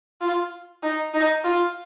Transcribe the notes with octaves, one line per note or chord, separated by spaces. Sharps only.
F4
D#4
D#4
F4